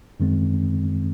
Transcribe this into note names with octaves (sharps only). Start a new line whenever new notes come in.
F#2 D#3 G#3 C4